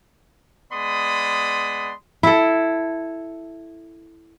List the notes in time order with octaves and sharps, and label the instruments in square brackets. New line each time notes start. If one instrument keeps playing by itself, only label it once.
[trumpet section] G#3 B3 D5 B5 C6 D#6
[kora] E4 A4